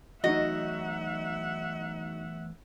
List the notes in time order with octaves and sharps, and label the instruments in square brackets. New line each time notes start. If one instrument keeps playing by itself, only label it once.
[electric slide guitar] E2 F#3 A3 [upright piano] D#4 F#4 [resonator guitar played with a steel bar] D#5 [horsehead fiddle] E5 F#5